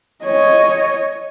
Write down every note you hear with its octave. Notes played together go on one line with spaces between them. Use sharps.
C#5 D#5